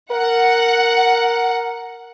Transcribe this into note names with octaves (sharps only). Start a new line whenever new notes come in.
A#4 F#5